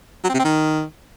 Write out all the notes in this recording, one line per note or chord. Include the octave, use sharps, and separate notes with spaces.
F#3
C4
C3
C4
D#3